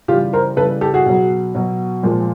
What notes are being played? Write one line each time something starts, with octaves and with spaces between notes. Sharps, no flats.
C#3 E3 G3 F4 G4
A#4 C5
C#3 E3 G3 A4 B4
G4 A4
F#4 G#4
B2 F#3
B2 F#3
A#2 F3 G#3